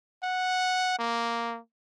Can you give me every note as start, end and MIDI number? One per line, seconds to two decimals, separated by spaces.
0.23 0.99 78
0.99 1.58 58